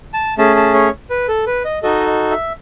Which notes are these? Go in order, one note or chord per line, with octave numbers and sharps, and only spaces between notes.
A5
A3 C#4 G#4 A5
A5
C#5
B4
A4
B4
D#5
D#4 F#4 A4 D#5
E5